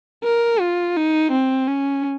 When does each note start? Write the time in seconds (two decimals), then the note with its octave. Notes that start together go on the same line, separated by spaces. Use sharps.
0.24 A#4
0.60 F4
0.96 D#4
1.31 C4
1.67 C#4